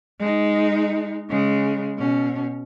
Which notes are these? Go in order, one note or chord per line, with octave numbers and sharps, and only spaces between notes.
G#3 D#4
C#3 G#3
B2 C#4